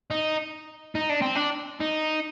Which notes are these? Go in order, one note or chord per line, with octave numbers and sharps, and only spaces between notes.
D#4
D#4
D4
C4
D4
D#4